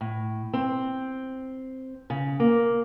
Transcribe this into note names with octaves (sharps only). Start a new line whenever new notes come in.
A2
C4
C#3
A#3